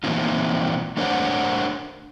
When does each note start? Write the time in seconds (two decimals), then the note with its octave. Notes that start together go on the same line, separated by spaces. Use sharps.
0.04 A#2 E3 A#3 C4 D#4 F4
0.97 A3 D4 A#4 C5 C#5 F#5